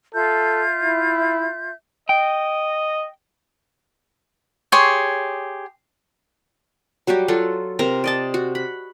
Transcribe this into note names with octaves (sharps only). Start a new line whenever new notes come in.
F4 A4 E5 G6
E4
D#5 G5
G4 G#4 C#5 C6
F#3 G3 F#4 G4
F#3 F4 A4 F#5
C3 C4 A#4 A#5
D5 D#5 A5
F#4
B5